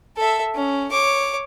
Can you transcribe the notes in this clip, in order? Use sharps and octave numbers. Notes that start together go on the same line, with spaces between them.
A4 E5
C#4
C#5 D6